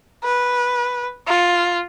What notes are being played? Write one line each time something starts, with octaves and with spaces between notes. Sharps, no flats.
B4
F4